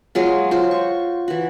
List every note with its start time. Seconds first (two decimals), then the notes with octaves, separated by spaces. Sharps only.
0.15 F#3 G#3 F4
0.51 F4 F#4 C5
0.71 C#6
1.28 E3 F#4